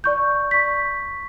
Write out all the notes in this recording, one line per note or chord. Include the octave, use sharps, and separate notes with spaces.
D5 C#6 G6
C#6 B6